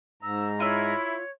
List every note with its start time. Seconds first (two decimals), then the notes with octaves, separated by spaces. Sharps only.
0.23 G#2 A#5 E6
0.60 E4 F4 C#5 E6